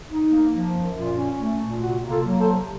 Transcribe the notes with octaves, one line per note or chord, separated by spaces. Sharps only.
D#4
A#3
F3
F#2
A#2 F4
C#4
A3
A#2
C3 F#4
A#3
F4 A4
F#3
A4 C5
C3